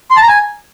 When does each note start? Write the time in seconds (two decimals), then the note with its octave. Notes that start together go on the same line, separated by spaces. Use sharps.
0.11 C6
0.17 A5
0.22 A#5
0.28 G#5